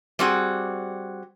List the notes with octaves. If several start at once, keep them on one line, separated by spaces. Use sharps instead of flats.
G3 C4 F#4 G#4